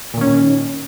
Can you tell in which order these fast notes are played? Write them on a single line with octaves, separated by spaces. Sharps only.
A#2 D#3 C#4